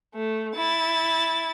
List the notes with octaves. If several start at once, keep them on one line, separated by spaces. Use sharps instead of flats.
A3
E4 A6